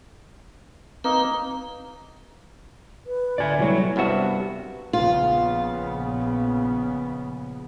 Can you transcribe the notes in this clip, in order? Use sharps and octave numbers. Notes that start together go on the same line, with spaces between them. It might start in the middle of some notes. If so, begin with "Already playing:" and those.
A#3 C4 D#4 B4
B4
D2 D5 E5 G#5
B2 F#3 G3 A3 E4 C#5
C2 G2 B3 F#4 E5
A#1 C#3 B3 F4